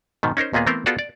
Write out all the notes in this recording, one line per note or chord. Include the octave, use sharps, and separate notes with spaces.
G#2 B2 D#3
C#4 D#4 A#4 C5
D#2 A#2 A#3 B3 G#4
E3 A3 B3 C4 A#4 C5
B3 F4 F#4 G#4 A4 D5
D5